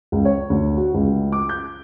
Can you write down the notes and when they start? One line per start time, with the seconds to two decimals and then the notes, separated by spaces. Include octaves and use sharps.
0.12 C#2
0.25 C#5
0.50 D2
0.77 F#4
0.94 C#2
1.32 D6
1.49 G6